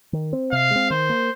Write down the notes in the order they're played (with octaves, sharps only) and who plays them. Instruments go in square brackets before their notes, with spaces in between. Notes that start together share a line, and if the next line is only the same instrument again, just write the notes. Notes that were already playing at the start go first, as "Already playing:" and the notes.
[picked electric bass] D#3
C4
[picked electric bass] C3 [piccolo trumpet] F5
[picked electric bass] G#3 C4
[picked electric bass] D#3 [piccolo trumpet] C5
[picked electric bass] A#3